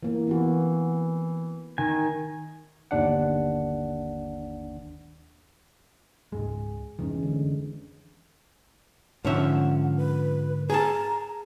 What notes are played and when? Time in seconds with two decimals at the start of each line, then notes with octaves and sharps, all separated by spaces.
0.03 E3 A#3
0.27 E3 B3 C4 F#4
1.78 D#3 G#5
2.91 G1 D#2 D4 F#5
6.32 C#2 G#2 G#3 G#4
6.99 F1 D#3 E3 G#3 C#4
7.23 D3
9.25 G#2 D3 F3 C#4 E5 F#5
9.97 B4
10.70 G#4 A5 A#5